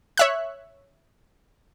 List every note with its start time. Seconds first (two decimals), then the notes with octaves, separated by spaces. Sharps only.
0.17 C#5 E5 F#6